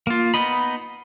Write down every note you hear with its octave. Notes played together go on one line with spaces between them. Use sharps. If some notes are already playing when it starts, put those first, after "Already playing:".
A#3 F4
B3 D#4 D#5 B5